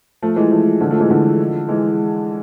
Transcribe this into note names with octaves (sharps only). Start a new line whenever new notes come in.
F3 A3
E3 G#3
F3 A3
D3 F3
F3 A3
E3 G#3
D3 F3
E3 G#3